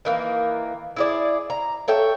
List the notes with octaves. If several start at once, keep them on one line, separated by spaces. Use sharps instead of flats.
D#3 E3 A#3
E4 G#4 D5
A#5
A4 C#5 E5 G5